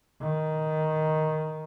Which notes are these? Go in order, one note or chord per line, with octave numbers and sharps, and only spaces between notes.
D#3